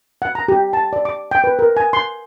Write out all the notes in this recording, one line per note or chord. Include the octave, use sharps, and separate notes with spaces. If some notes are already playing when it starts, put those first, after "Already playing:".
F#5
A#5
G4
A5
D5
D6
G5
B4
A#4
G#5
C6